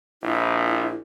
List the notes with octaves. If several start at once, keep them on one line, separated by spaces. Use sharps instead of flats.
A#1 E4